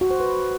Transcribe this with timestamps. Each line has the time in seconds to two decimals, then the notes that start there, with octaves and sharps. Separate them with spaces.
0.01 F#4
0.11 C5
0.20 B4